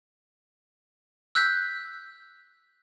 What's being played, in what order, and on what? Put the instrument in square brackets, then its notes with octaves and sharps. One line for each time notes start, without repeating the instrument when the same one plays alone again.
[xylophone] E6 F#6 G6 B6